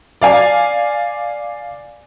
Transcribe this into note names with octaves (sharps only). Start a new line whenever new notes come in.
D5 F5 G#5